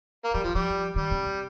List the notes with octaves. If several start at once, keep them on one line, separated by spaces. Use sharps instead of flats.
A#3
F3 G3
D#3 F3
F3 G3
D#3 G3
C3